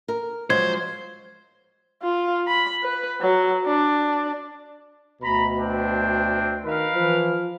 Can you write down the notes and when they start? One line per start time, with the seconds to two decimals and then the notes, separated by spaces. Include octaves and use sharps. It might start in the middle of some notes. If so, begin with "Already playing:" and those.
0.08 A#4
0.50 F3 F#3 G#3 C5 G#6
2.03 F4
2.48 B5
2.83 B4
3.21 F#3
3.66 D4
5.21 D2 B2 A#5 B5
5.58 C4 D4 G5
6.65 D#3 A#4 B4 F5
6.94 E3 F3